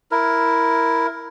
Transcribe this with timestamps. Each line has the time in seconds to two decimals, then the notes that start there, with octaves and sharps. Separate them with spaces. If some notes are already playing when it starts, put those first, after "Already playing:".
0.11 E4 A#4